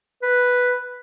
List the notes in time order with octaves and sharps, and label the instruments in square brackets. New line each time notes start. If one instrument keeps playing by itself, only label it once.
[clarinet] B4